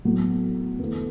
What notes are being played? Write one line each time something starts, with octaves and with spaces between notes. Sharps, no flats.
A2 F#3 B3
E2 D3 A3